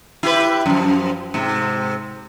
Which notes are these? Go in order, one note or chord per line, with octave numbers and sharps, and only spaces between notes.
E4 G4 B4
F#2 F3
G#2 C3